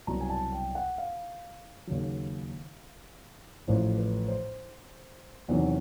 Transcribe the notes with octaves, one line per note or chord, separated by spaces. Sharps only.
C2 B2 F#3 A#5
G#5
A5
G5
F#5
F5
D#2 C#3 F#3
A1 A2 F3 C5
B4
C5
E2 C3 D#3 F#3